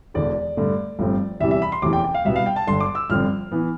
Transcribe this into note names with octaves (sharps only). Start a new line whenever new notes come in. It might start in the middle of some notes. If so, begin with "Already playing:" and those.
E1 E2 D3 D5
G2 D3 A3
G1 G2 F3 A3 C4
E2 C3 E3 G3 E5
E5
B5
C6
F1 E2 C3 E3 D6
G5
G5
F5
C2 B2 B3 E5
F5
G5
A5
G1 G2 D3 C6
D6
E6
G1 G2 D3 F3 C4 F6
E3 B3